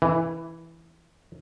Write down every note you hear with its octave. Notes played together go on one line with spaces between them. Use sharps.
E3